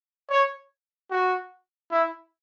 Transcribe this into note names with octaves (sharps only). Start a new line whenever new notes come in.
C#5
F#4
E4